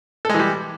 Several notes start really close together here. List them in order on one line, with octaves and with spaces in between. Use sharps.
A4 G#3 E3 G3